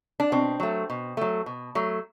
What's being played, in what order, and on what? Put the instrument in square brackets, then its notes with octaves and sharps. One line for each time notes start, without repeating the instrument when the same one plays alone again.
[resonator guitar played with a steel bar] D4
B2 C4
F#3 A3
B2
F#3 A3
B2
F#3 A3